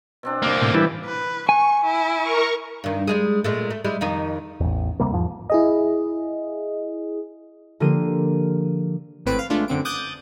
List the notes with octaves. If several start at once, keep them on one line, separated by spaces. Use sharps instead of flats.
B2 C4 D4
C2 A#3
A2 C3
E3 G3 D4 E4 D5
B4
G#5 C#6
E4
A#4 C#6
G2 D#3
G3 G#3 G#4
A#2 G#3 A3
A3
G3 G#3 E4
F2 D#3 D#4
A1 E2
D2 C3 G3 A#3
E2 G#2 F3
E4 G#4 D#5
D3 F3 A#3 G4 C6 D#7
G#1 A2 C4 B4 D7
F5
G#3 A3 D4 F4
F#2 D3 C4 D7
D6 D#6 F#6 G6 A6